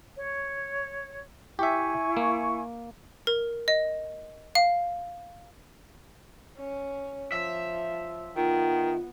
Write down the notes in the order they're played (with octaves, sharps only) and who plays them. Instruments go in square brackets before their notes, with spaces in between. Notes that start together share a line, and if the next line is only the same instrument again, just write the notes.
[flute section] C#5
[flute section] E4 G#5 C#6 [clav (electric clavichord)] G4 E5
[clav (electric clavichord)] A#3
[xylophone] A#4
D#5
F5
[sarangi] C#4
[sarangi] F3 [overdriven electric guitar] E5
[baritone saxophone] D#3 [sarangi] B3 [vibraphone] F4